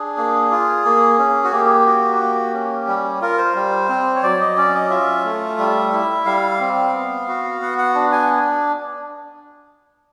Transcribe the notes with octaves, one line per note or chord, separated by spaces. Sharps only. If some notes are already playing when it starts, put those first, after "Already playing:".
Already playing: D4 G#4
A#3
F4
A#3
C#4
F#4
A#3 G4
F#4
A#3
C#4
G3
F4 A#4
C5
G3
C4
C#5
F#3 D5
D#5
C#4 D5
D#5
F4 E5
A3
G3
E4
G3 F5
C4
B3
F#4
B3 F#5
F#5
D4
G#5